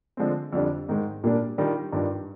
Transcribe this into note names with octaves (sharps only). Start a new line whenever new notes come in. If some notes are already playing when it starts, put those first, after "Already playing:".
D3 F3 G#3 C4
F2 D3 G3 D4
G#2 D#3 G#3
A#2 G3 A#3 D4
D#3 G3 D4 F4
G2 D#3 G3 D4 F4